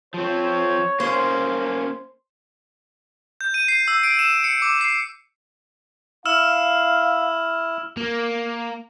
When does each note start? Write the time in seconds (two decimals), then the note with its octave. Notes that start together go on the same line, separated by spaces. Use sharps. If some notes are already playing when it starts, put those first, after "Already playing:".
0.14 F3 C4 C#5
1.00 A#3 C#4 C5
3.41 G6
3.54 D#7
3.68 C7
3.88 E6
4.03 D7
4.19 E7
4.44 C#7
4.62 D6
4.81 C7
6.26 E4 F5 E6 F6 E7
7.97 A#3